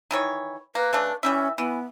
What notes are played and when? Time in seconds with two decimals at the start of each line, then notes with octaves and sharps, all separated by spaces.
0.11 D#3 E3 C#5
0.75 A#3 B4
0.93 C#3 A3 D4
1.23 E3 G3 C#4 E5
1.58 E3 B3